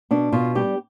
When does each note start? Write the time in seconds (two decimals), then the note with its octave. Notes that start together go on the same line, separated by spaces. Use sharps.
0.11 B2 D4
0.33 B2 F4
0.55 G3 G4